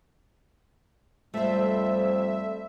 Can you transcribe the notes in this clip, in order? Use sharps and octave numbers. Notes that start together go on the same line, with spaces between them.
F2 G3 A3 C5 E5